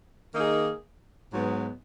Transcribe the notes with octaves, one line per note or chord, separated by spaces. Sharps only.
D#3 A#3 D#4 G#4
G#2 F#3 B3